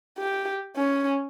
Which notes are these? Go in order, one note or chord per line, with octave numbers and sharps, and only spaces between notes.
G4
C#4